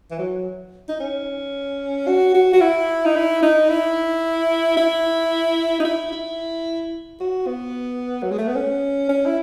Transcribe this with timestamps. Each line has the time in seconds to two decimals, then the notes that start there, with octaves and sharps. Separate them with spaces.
0.11 E3
0.19 F#3
0.88 D#4
1.00 C#4
2.07 F#4
2.34 F#4
2.53 F#4
2.61 E4
3.05 D#4
3.16 E4
3.42 D#4
3.69 E4
4.77 E4
5.80 D#4
5.85 E4
6.12 E4
7.20 F#4
7.47 B3
8.22 F#3
8.31 G#3
8.38 A3
8.47 B3
8.55 C#4
9.09 C#4
9.26 E4